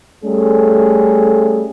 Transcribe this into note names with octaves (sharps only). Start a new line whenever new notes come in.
G3 A3 C#4 G#4 A4